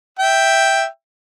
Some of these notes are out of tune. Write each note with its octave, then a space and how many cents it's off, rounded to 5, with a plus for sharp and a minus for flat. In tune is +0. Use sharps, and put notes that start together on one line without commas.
E5 +0 G5 +0